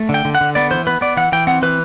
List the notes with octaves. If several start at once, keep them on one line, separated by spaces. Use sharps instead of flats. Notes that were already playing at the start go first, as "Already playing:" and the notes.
Already playing: A3
D3
G5
D3
F#5
D3
B3 D5
E3 C5
B3 B4
B3 D5
E3 F#5
E3 G5
C4 F#5
E3 B4